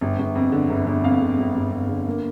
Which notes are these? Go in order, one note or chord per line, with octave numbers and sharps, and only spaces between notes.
G1
G1
F2
D3
G1
G1
F2 F5
D3
G1
G1
F2
D3
A#3